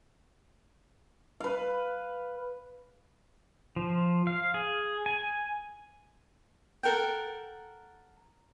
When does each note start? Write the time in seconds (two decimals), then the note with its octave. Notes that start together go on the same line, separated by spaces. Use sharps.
1.40 B4 F5
3.76 F3
4.27 F5
4.54 G#4
5.06 G#5
6.83 A4 A#4 F#5 G5